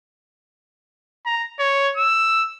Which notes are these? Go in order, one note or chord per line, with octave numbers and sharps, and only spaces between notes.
A#5
C#5
E6